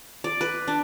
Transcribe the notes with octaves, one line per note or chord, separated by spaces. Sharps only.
D5
B4
D4